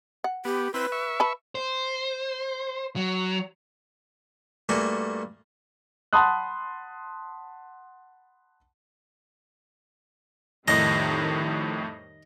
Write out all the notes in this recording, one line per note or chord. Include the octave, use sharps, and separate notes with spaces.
F#5
B3 G4
C4 E4 B4
E5 C#6
B4 A5 B5
C5
F#3
G2 A3 A#3 F#4 G#5 C#6
F#5 A5 B5 C6 D#6 F#6
F2 A2 D#3 G3 D#5